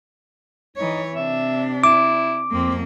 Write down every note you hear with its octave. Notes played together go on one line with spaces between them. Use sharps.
E3 D#4 C#5
C3 D4 E5
E4 D6
F2 A#3 C4